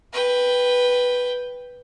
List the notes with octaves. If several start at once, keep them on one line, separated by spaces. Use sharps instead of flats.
B4 G5